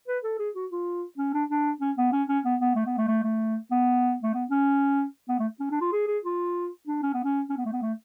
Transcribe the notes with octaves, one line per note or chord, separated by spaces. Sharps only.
B4
A4
G#4
F#4
F4
C#4
D4
D4
C#4
B3
C#4
C#4
B3
B3
A3
B3
A3
A3
A3
B3
A3
B3
C#4
B3
A3
C#4
D4
F4
G#4
G#4
F4
D4
C#4
B3
C#4
C#4
B3
A3
B3
A3